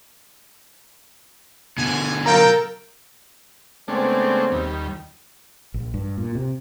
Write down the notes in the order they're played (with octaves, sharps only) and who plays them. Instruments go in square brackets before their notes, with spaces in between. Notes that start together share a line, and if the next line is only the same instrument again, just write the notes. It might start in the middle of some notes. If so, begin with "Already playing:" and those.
[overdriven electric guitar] B2 D3 [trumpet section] G#5
[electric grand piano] F#3 F5 A#5 [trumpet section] A4 G5 [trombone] A#4
[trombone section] C#3 B3 C4 [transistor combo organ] G#3 A3 D4
[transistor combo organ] D#2 G3
[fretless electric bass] A#1
G2
A#2
C3